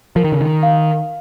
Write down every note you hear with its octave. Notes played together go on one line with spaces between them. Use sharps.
F3 A#4
D#3
C#3
D#3
F5